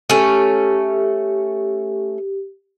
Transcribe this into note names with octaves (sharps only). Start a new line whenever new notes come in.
A3 C#4 G4